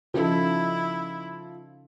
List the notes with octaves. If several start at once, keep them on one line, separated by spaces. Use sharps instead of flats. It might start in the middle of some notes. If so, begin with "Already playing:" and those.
C#3 F3 D#4 E4 A4